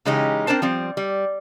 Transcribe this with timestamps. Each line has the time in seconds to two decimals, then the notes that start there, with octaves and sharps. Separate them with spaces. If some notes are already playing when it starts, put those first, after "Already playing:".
0.05 C#3 E3 G#3 C#4 D#4 G4
0.47 C4 D4 A#4 C5 A5
0.62 F3 G3 C4
0.97 G3